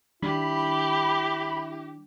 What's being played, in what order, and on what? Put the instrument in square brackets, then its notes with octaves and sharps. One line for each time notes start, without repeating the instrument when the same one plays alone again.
[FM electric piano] D#3 G3 D4 [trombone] E4 [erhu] G4 [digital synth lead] B5